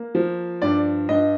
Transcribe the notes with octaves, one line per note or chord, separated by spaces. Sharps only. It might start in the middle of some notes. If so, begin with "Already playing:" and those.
Already playing: A#3
F3
G2 D5
G2 D#5